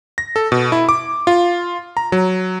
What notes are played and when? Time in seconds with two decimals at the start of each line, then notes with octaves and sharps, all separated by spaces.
0.18 A#6
0.36 A4
0.52 B2
0.72 E4
0.89 D6
1.27 F4
1.97 A#5
2.12 F#3